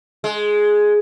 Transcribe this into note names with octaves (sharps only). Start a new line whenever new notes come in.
G#3